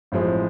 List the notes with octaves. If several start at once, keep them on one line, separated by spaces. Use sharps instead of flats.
A1 A2 F3 G#3 C4